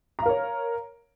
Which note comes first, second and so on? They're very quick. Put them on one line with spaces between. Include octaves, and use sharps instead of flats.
A#5 F5 A#4 C#5